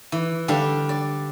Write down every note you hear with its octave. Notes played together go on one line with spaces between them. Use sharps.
E3
D3 G3 D4 F5
D5